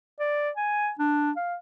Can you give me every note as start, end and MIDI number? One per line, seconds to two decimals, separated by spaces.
0.19 0.50 74
0.57 0.91 80
0.99 1.31 62
1.36 1.56 77